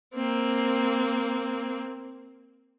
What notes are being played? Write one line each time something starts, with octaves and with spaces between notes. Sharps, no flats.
A#3 C4